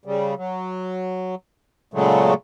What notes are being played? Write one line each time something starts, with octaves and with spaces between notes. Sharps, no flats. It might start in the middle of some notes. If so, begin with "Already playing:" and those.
C#3 G3
F#3
A#2 C#3 F#3 G#3 A3